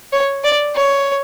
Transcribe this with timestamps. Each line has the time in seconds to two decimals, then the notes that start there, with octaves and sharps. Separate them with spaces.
0.13 C#5
0.44 D5
0.75 C#5